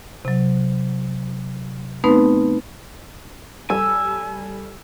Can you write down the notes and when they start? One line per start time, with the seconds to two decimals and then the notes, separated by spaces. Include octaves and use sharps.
0.25 C3 F#3
2.04 A3 B3 C4 D#4 B4
3.70 G3 A4 G#5 E6